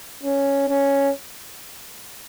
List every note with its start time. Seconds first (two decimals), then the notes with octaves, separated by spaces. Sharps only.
0.23 C#4
0.69 C#4